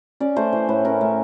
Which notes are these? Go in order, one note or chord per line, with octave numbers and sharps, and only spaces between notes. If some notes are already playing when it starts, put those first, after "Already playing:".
C#4 D5
A3 C5
E3 C5
A2 B4
C#4 A#4
A3